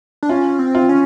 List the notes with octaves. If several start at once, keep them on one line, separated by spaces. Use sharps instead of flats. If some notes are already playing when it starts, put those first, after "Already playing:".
D4
C#4 F4
C4
F4
C#4